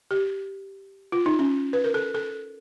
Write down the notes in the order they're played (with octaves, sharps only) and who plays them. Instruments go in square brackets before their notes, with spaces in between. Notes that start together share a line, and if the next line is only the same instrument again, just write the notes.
[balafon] G4
F4
D#4
C#4
B4
A#4
A4
A4